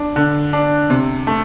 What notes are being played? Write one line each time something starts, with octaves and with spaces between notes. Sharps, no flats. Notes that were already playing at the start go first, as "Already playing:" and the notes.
Already playing: D4
D3
D4
C3
A3